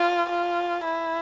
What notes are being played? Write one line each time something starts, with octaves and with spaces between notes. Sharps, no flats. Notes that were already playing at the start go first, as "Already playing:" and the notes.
Already playing: F4
F4
E4